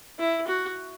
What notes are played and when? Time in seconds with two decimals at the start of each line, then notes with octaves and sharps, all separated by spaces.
0.19 E4
0.48 F#4